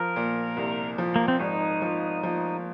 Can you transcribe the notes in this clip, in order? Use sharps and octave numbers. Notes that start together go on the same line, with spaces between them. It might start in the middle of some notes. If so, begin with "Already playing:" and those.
Already playing: F3 A#4
A#2
C2
F3
A#3
C4
G#1 D#4
F3
F3